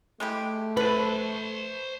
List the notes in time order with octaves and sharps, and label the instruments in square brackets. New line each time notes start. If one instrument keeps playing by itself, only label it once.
[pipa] G#3 E4 G4 [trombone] A3
[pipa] A4 [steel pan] B4 [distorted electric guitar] C5 B5